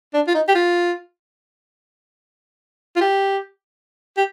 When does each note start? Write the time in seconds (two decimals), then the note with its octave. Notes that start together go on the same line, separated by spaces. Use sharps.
0.14 D4
0.27 F4
0.35 D#4
0.48 G4
0.55 F4
2.96 F4
3.01 G4
4.17 G4